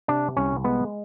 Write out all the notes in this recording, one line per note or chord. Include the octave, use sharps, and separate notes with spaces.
C3 D4
C2 C#4
G#3 B3